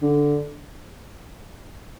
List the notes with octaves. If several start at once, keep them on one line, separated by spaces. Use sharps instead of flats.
D3